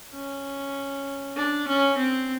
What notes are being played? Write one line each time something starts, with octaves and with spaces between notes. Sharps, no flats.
C#4
D4
C#4
C4